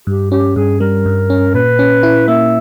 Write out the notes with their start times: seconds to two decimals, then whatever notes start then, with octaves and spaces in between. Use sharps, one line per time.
0.07 G2 G4
0.32 C#4 G4
0.56 G2 G#4
0.80 G3 A#4
1.06 G2
1.30 C#4
1.54 A#2 B4
1.79 C#4
2.03 E4
2.28 A#3 E5